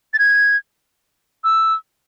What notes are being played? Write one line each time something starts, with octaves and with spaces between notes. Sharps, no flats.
A6
G#6
E6